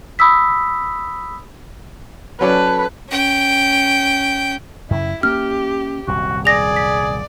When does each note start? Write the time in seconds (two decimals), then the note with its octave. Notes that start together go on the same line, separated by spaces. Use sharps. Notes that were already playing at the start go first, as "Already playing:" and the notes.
0.19 B5 D#6 E6 B6
2.41 F#3 C#4 A4 B4 D5
3.09 C#4 G5
4.91 F#2 C#3 E4
5.23 A#3 C#4 G4 F6
6.07 D#1 C2 F#2 F#4
6.45 G#4 D5 A#6 F7
6.76 B6